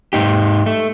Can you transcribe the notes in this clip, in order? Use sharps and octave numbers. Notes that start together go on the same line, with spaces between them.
G#2 D#4 G4
A3